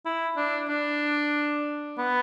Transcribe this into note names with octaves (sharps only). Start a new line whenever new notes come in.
E4
D4
D4
B3